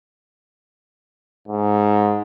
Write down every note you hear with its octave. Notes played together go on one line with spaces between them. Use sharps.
G#2